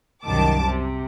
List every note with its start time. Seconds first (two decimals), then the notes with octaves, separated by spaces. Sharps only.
0.25 C2 F#2 D#3 A5 D6
0.64 C3